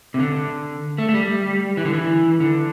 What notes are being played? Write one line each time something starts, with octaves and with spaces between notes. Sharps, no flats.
C3
D3
A3
A3
G3
E3
D3
E3
D3